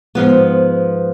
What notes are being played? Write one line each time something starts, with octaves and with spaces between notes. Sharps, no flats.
G#2 F3 B3